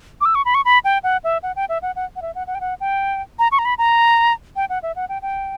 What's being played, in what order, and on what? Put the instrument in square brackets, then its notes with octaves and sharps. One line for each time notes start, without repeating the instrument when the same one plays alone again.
[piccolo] D6
E6
C#6
B5
C#6
B5
G5
F#5
E5
F#5
G5
E5
F#5
F#5
F#5
E5
F#5
F#5
G5
F#5
G5
A#5
C#6
A#5
B5
A#5
G5
F#5
E5
F#5
G5
G5